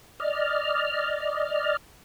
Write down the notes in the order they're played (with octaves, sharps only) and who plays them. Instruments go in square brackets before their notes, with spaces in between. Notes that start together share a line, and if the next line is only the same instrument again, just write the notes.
[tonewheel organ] D5 D#5 F6